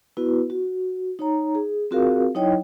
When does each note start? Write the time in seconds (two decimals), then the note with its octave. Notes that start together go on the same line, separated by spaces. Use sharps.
0.17 B3 E4 F#4 B4
0.50 F#4
1.19 D#4 C#5 A#5
1.55 G#4
1.91 C4 F4 F#4 G#4 A#4 F5
2.35 F#3 D#4 E4 C#5 D#5 G5